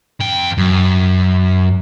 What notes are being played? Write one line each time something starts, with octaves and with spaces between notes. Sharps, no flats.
F2 G5
F#2